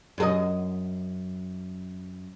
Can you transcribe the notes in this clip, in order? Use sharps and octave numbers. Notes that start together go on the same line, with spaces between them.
F#2 A4 D#5